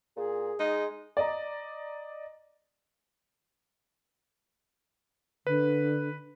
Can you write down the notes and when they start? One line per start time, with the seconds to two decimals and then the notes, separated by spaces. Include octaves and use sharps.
0.17 A#2 G#4
0.60 G#3 D#4
1.17 D5 D#5 A#5
5.47 D3 B4